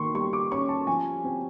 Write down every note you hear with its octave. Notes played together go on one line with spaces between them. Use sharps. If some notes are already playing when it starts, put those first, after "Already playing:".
Already playing: D#3 A#3 C6 C#6
G3 C#6
D6
C#4 C#6
A5
F3 G#5
C4